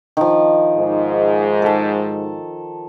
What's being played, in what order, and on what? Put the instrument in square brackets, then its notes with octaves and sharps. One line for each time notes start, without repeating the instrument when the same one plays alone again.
[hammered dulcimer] D#3 F3
[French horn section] G#2
[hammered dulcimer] A4 A5